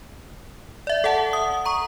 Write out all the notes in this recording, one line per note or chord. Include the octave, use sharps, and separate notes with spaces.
D5 E5
A4 E5 F#5 A5
D#6
A#5 C#6